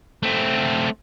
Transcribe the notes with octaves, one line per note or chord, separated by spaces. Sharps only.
A3 C4